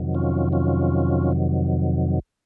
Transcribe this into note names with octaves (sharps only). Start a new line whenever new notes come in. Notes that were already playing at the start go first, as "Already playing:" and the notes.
Already playing: F2 C3 D#3 F#3
C#4 F4
C#4 F4